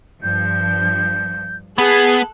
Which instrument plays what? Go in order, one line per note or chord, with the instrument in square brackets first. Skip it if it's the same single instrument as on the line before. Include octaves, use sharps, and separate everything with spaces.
[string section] G2 F3 [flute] G6
[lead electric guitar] B3 [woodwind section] G#4 [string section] A4 F#6